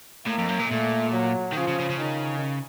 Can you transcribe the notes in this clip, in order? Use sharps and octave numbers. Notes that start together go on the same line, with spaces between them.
A2 A#3
F2
F#2
A#2
A#2 A3
F#3
D#3
C#3 F3
C#3
C#3
C#3
D#3